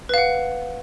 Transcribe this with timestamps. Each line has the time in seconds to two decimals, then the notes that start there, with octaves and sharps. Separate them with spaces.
0.09 B4
0.14 F5
0.18 F#5